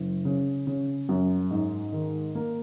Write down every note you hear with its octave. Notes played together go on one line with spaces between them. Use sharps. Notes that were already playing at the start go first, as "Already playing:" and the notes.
Already playing: F#1
C#3
C#3
F#2
G#2
D#3
A#3